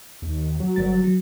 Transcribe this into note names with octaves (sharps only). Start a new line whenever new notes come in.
D#2
F#3
G1 G3 A6
F#3